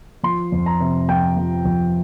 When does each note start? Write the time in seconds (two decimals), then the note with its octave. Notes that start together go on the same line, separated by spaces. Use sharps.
0.23 F3 C6
0.52 F2
0.66 A#5
0.80 C3
1.08 F2 G5
1.37 F3
1.65 F2